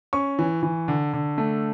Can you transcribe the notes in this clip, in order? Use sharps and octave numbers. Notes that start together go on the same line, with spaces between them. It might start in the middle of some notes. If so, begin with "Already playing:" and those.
C#4 C#6
E3
E3
D3
D3
A3